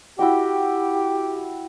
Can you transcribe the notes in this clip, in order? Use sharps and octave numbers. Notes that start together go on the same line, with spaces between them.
E4 F#4 G4 G5